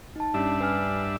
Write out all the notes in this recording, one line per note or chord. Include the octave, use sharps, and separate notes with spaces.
D#4 A5
G2 C#4 D4 G4 E5
B4 G#5 F6